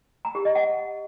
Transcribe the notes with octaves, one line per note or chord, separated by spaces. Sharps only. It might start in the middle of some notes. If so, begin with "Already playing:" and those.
A#5
G4
D#5
F#5